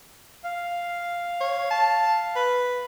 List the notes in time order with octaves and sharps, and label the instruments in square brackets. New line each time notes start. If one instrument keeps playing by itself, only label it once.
[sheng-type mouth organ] F5
[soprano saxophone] C#5
A5
B4